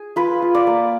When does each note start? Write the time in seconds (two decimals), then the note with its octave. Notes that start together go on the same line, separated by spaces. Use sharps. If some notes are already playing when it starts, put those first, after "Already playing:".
Already playing: G#4
0.16 F4 B4
0.42 F4
0.55 D5
0.67 A#3